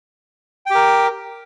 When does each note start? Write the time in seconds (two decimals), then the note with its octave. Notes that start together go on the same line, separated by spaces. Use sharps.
0.66 G5
0.70 G4
0.75 A#4